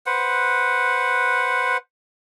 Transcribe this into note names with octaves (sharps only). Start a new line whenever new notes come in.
B4 C5 F#5